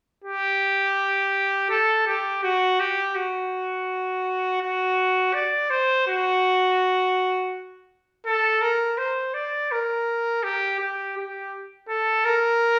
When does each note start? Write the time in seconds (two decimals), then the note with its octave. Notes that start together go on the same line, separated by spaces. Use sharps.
0.24 G4
1.70 A4
2.07 G4
2.43 F#4
2.80 G4
3.15 F#4
4.61 F#4
5.34 D5
5.70 C5
6.07 F#4
8.26 A4
8.62 A#4
8.98 C5
9.34 D5
9.71 A#4
10.43 G4
10.79 G4
11.17 G4
11.88 A4
12.25 A#4